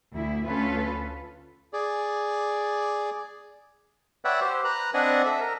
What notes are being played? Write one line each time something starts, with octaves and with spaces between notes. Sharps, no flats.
D2 E4
D2 C#4 F4 A4 B4
G#4 D5
B4 C#5 D5 E5 F#5 G5
G4 C5
B4 A#5 F#6
C4 D4 D5 D#5 F#5 G#5
A4 E5
A#4